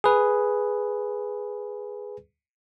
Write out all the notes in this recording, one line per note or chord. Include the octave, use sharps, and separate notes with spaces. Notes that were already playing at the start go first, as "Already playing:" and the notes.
G#4 B4